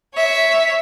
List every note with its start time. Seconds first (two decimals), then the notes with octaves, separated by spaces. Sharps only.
0.15 C#5 E5